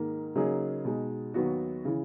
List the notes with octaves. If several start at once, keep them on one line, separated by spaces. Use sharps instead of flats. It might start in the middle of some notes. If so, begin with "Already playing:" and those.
Already playing: G#2 D#3 A#3
C#3 F#3 A#3 D#4 G#4
B2 G#3 D#4
D#2 D#3 F#3 B3 F#4
C#3 E3